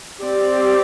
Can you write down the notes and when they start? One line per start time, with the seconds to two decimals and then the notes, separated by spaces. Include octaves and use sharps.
0.20 C4 G4 D5